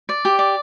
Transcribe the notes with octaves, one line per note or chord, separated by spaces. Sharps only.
D5
G4
D5